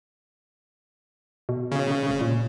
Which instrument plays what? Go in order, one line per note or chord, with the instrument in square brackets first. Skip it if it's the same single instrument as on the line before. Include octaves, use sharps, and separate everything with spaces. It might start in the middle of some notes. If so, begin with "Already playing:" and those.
[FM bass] B2
[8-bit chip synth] C#3
[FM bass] E1
A#2